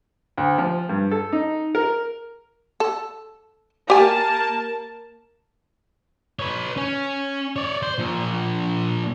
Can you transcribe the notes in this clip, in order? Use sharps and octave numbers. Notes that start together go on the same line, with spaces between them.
D2
F3
G2
A4
D#4
A#4
A4
A#3 G4 A#4 G#5 A5
B4 C#5
C#4
C#5 D5
C5
A#2 F3